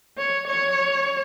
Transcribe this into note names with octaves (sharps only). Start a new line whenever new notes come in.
C#5
C#5